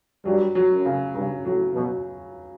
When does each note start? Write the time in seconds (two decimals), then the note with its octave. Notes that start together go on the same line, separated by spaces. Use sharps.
0.25 G2 F#3
0.55 F#3
0.70 F#2
0.85 C#3
1.15 G2 C#3
1.45 A2 F#3
1.75 B2 F#3